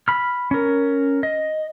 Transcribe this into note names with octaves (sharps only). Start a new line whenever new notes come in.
B5 F6
C#4 A#4
D#5